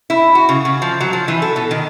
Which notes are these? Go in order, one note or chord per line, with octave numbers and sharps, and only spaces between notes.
E4
F#4
C#3
C#3
F3
F#3
F3
E3
A4
B2
D#3